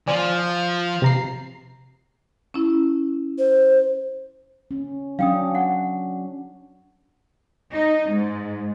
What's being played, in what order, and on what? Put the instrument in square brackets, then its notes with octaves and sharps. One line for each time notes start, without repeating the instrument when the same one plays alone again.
[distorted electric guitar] F3 [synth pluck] D5 G#5
[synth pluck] C3 A#5 C7
[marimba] C#4 E4
[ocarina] C5
[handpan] C#4
[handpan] F#3 C#4 D4 [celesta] F5 G5 D#6
[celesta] F#5
[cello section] D#4
G#2